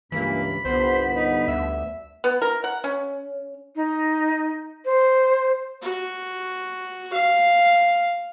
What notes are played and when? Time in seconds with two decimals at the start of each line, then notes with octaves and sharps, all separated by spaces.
0.12 C#2 G2 E3 A#3 B5
0.65 G1 C2 B3 C5
1.15 D#4
1.48 D2 E5
2.24 B3
2.42 A#4
2.64 F#5
2.84 C#4
3.76 D#4
4.85 C5
5.82 F#4
7.13 F5